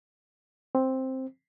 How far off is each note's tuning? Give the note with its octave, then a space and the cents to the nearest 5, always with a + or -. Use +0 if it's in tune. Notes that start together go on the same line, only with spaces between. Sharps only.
C4 +5